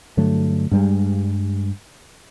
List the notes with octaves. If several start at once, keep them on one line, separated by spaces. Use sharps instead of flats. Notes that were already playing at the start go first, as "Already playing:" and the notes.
G2 D3 F#3 A3
G2 G3 G#3